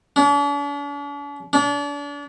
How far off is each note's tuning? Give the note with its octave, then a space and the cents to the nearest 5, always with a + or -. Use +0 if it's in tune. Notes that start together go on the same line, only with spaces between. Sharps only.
D4 -45
D4 -35